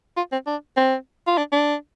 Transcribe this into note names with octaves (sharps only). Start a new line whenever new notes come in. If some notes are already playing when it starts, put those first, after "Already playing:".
F4
C4
D4
C4
F4
D4
D4